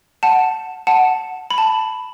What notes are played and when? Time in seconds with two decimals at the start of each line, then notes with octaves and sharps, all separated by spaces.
0.23 F#5 A5
0.87 F#5 A5
1.51 B5
1.58 A5